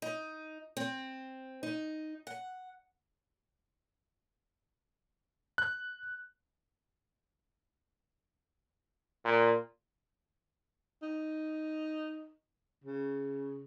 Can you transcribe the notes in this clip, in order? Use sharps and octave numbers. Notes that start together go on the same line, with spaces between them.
D#4
C4
D#4
F#5
F#6
A#2
D#4
C#3